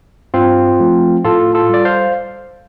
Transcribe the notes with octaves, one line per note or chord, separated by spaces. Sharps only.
G2 C4 F4
F3 A3
A2 F4 A4
F4 A4
G3 D5
C5 F5